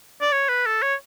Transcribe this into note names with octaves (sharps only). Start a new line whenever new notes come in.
D5
C#5
B4
A4
C#5